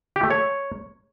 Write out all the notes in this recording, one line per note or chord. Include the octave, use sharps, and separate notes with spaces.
G4
A3
C#5